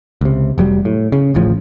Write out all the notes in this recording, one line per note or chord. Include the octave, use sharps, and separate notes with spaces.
C#2 C3
F1 F#3 G3
A2
C#3
D1 A1 A2 F3